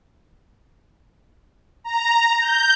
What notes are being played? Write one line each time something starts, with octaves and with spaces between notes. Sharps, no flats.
A#5
G6